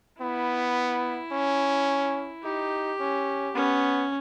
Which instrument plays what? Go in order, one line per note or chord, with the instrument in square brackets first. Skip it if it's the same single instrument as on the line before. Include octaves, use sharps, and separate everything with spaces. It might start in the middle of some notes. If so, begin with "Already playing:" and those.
[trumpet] B3 [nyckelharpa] E4
[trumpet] C#4
[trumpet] D#4 [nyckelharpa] G4
[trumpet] C#4
[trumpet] B3 [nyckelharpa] C#4